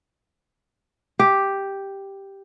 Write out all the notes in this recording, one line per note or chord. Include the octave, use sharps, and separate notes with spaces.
G4